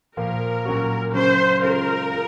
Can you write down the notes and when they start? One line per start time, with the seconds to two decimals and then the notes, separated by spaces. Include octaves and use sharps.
0.17 A#2 F3 A#3 A#4
0.65 A#2 F#3 C#4 F#4
1.13 C#3 F#3 C#4 C5
1.62 C#3 G#3 C#4 F4 A#4
2.10 F4 G#4